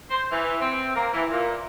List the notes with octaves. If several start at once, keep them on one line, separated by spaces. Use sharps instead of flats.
C5
E3
C4
A#3
E3
A#2